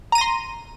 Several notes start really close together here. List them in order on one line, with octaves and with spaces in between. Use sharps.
A#5 D#7 A#6 C6